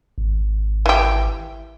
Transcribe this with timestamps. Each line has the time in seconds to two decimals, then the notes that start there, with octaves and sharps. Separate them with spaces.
0.18 G#1
0.86 E3 G4